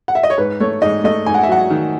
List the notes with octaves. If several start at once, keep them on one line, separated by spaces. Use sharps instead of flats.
F#5
E5
D#5
C#5
G#2 B4
A3 C#5
G#2 D#5
A3 D#5
G#2 G#5
F#5
E5
F#3 F#5
D#3